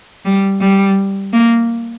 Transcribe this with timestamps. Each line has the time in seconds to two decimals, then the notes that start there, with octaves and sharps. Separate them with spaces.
0.25 G3
0.61 G3
1.33 A#3